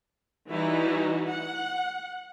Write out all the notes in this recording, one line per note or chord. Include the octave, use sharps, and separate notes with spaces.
E3 G3 D#4 E4 F#4
F#5